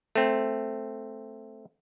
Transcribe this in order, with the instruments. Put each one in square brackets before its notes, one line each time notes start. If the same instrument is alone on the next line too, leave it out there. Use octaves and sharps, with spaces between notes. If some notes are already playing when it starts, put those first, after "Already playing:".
[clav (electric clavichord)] A3 C4